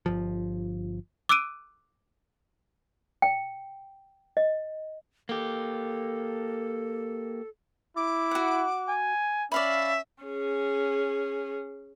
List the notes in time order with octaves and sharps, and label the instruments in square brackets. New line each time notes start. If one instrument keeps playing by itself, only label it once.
[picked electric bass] G1 F3
[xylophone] D6 E6 F#6 D7 D#7
[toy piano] G5
D#5
[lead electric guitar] A#3 G4 [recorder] A4
[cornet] E4 [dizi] D6
[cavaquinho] F#4 F#5
[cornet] G#5
[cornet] C#4 [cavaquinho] D5 F5 B5 [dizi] E5
[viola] C#4 G#4